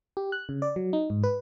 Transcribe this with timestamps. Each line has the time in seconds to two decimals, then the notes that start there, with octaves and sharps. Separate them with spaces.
0.17 G4
0.32 F#6
0.49 C#3
0.62 D5
0.76 F#3
0.93 D#4
1.10 G#2
1.23 B4